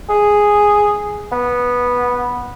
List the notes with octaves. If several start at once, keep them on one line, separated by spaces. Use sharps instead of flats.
G#4
B3